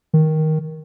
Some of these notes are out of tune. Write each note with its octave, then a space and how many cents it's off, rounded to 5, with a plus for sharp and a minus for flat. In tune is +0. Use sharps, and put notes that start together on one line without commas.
D#3 +10